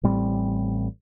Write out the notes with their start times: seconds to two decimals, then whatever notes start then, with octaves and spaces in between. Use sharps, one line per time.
0.03 A1 A2 G3 C4